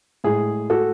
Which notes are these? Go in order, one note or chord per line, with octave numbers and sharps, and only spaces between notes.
A2 G#3 G#4
F#4 A4